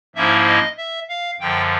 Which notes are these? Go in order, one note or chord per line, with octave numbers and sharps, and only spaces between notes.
G#2 F3 A#3 C#4 E4 E5
D#5
E5
F5
F#2 D3 F3 G5